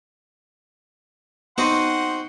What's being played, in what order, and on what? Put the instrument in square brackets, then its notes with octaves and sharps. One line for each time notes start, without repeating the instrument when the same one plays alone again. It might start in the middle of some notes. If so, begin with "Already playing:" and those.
[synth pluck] B3 D#7 [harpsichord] C4 F#4 [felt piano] D#4 [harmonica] F#5 C6